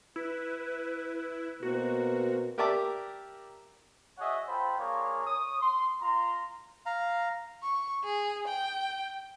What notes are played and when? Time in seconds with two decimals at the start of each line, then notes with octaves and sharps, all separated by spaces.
0.16 E4 B4
1.63 B2 A#3 C4 F#4 A#4
2.58 G4 A#4 D5 E5 A5 D6
4.18 F#4 G#4 C#5 D#5 E5 F#5
4.48 F4 A4 C5 G5 B5
4.78 A#3 D4 F4 G#4 A#4 C#5
5.25 C#5 D#6
5.60 C6
6.02 F4 A#5 C6
6.86 F5 A#5
7.63 C#6
8.05 G#4
8.48 G5